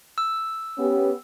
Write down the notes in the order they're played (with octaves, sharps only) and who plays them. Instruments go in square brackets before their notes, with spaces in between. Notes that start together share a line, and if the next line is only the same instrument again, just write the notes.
[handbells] E6
[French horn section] B3 C#4 G4